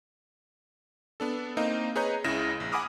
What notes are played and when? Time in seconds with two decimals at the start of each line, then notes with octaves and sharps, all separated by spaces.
1.20 B3 D4 A4
1.57 A#3 C4 D#4 D#5 F5
1.96 G#4 B4 C#5 D#5 A#5 G6
2.24 C#2 C#3 E4 A#6 E7
2.60 A#1
2.72 F#5 G#5 B5 D6 D#6 F6